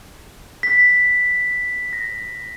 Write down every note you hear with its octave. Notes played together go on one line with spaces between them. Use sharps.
B6
A#6